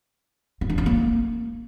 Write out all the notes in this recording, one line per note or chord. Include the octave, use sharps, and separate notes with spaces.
C4
D4
C#4
A#3